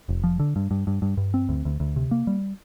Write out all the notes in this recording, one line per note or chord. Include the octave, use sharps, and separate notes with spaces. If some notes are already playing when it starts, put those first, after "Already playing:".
F1
F3
D3
G2
G2
G2
G2
G2
C4
D2
D2
D2
C3
A#3
G3